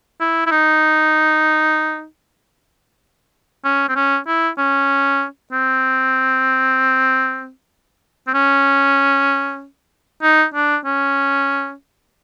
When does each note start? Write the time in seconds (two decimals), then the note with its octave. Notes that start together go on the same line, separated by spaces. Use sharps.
0.21 E4
0.47 E4
0.51 D#4
3.65 C#4
3.89 C4
3.96 C#4
4.27 E4
4.58 C#4
5.53 C4
8.28 C4
8.34 C#4
10.23 D#4
10.55 D4
10.85 C#4